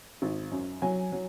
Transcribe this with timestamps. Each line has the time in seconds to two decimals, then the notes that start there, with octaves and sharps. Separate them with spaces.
0.22 G#1
0.51 F#2
0.82 F#3 G#5
1.12 F#3